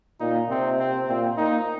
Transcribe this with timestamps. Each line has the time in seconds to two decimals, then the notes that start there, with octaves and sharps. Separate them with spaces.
0.20 A#2 D#4
0.50 C3 C4
0.80 C4
1.08 A#2 C4
1.37 A#3 D#4